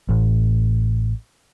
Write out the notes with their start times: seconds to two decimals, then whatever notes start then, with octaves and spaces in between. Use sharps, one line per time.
0.09 A1